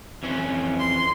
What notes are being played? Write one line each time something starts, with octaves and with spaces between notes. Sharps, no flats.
F2 E3 C#4
C6